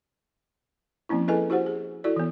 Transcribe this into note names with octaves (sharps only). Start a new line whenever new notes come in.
F3 A#3 C4 C#4 E4
E4 G#4 A4 B4 D#5 G#5
E4 F#4 G4 C5 F#5
G#4
E4 F#4 A4 D5
E3 B3